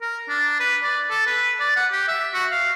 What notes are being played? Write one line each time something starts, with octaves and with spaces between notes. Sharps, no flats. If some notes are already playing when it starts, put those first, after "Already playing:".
A#4
D4
B4
D5
A4
B4
D5
F#5
G4
E5
F#4
F5